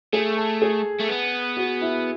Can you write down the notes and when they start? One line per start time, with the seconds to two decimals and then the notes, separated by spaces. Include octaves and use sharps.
0.13 A3 G#4
0.37 A4
0.62 G#4
1.00 A3
1.09 B3
1.57 F#4
1.81 E4